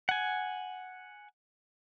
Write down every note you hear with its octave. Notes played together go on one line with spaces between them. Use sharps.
F#5 G#5